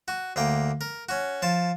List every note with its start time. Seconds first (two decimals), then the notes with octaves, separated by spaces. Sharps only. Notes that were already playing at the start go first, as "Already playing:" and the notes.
0.08 F#4
0.36 D2 A#3 G5
0.81 A#4
1.09 C#4 F#4
1.42 F3 A5